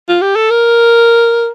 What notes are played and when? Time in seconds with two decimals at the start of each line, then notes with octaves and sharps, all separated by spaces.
0.09 F4
0.22 G4
0.36 A4
0.51 A#4